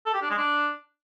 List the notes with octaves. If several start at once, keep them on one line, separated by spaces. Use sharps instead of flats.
A4
G4
D4
G#3
D4